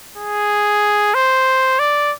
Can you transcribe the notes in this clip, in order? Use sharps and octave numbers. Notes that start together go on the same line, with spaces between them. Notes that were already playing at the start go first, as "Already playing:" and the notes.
G#4
C5
D5